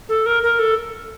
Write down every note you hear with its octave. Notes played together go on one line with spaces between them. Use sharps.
A4
A#4
A#4
A4